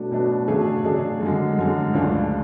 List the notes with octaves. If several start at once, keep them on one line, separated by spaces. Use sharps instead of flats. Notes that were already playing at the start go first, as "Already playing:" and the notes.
Already playing: B2 F#3 A3 D4
B2 F#3 A3 D4
C#3 F#3 A3 D4 G#4
C#3 F#3 A3 D4 G#4
F#2 D3 G#3
F#2 D3 G#3
C#2 C#3 F3 A3 D4